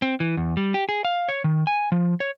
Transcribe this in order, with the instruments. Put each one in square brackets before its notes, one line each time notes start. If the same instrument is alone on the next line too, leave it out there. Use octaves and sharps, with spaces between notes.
[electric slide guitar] C4
E3
E2
G3
G4
G#4
F5
C#5
D#3
G#5
F3
C#5